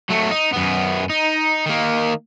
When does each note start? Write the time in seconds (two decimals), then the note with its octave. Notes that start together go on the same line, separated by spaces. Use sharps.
0.10 F#3 A3
0.31 D#4
0.53 F#2 B3
1.10 D#4
1.66 D#3 A#3